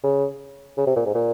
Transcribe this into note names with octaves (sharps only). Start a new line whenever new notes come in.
C#3
C#3
C3
A#2
G#2
A#2